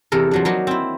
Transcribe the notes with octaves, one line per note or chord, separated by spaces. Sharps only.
E2 C3 A4 A#4
F3 F#3 D4
F#3 A#3 D#4
C4 E4